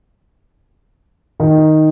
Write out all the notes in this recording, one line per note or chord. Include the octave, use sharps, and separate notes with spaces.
D#3